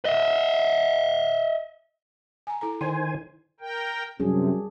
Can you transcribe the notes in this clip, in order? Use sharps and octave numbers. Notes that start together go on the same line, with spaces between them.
D#5 E5
G#5 A#5
E4 A4 A#5
D#3 C5 D5 G5 G#5 C6
A#4 G5
F#2 C3 G3 D4 G#4